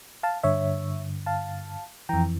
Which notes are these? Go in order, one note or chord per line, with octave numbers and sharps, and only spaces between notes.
F5 A5
G2 D3 C#5 E5
F5 A5
F2 E3 G5 A#5